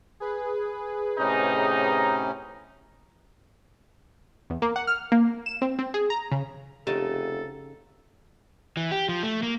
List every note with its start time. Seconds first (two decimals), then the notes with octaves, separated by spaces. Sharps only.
0.20 G#4 B4
1.18 A2 C3 C#4 D#4
4.50 E2
4.62 A#3
4.76 F#5
4.87 F6
5.12 A#3
5.46 E7
5.62 C4
5.79 C4
5.94 G#4
6.10 A#5
6.32 C#3
6.87 F1 C#3 D#4 G4 A4 A5
8.77 E3
8.91 G4
9.09 F3
9.23 A3
9.43 A#3